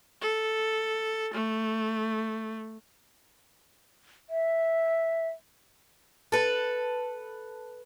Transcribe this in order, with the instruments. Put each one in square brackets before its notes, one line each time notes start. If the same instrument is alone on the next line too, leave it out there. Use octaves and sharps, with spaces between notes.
[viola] A4
A3
[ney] E5
[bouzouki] A4 B4